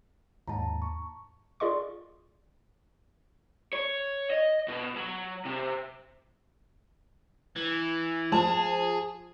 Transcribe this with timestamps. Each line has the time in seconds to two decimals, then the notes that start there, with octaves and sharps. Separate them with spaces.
0.48 D#2 G#2 A5 A#5
0.82 C#6
1.60 F4 G#4 D5 D#5 C6 C#6
3.73 C#5
4.31 D#5
4.68 B2
4.96 F#3
5.45 C3
7.56 E3
8.32 F3 G#4 A5